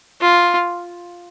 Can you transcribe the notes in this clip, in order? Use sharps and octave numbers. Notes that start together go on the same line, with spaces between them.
F4